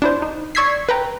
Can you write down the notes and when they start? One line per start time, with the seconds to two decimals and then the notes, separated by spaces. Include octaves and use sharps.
0.02 D4 E4 C5
0.22 D#4
0.55 D5 C#6 E6 G#6 B6 C7
0.89 B4 G5 A#5